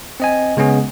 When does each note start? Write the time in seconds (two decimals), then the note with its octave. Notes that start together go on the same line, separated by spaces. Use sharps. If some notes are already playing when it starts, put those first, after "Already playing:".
0.20 C4 D#5 G#5
0.57 C#3 G#3 B3 C#4 G#4